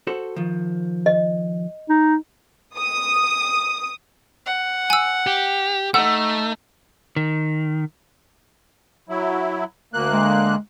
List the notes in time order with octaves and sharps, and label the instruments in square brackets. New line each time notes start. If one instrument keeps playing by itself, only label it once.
[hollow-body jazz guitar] F#4 A4 C5
D#3 F3
[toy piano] D#5
[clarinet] D#4
[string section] D#6
[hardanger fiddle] F#5
[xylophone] G#5 E6
[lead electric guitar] G4
[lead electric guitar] A3 [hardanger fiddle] D#4 [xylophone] F#5 [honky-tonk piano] E6
[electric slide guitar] D#3
[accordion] F#3 E4
D2 A#3 F#6
[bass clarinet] G#3